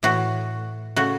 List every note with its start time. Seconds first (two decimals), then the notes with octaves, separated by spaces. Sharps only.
0.03 A2 E3 A3 F#4
0.96 C#3 A3 F#4